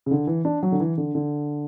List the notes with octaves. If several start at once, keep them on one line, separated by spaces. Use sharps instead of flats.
C#3
D3
E3
D4
F#3
D3
E3
D3
D3